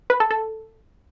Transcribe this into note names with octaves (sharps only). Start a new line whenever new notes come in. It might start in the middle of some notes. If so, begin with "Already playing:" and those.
B4
A4
A4